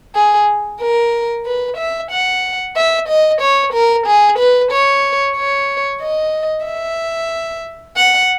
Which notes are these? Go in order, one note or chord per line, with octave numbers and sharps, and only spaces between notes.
G#4
A#4
B4
E5
F#5
E5
D#5
C#5
A#4
G#4
B4
C#5
C#5
D#5
E5
F#5